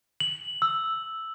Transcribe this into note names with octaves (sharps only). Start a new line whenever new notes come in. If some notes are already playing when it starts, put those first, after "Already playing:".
F#7
E6